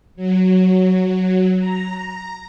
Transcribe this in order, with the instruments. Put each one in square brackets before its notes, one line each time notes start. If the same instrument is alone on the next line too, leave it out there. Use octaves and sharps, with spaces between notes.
[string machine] F#3
A#5